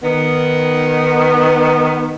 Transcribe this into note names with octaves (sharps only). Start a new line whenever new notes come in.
D#3 B3